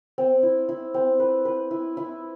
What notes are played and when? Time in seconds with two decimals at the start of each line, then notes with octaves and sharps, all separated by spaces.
0.18 C4
0.43 E4
0.69 E4
0.94 C4
1.20 B4
1.45 B4
1.71 E4
1.97 E4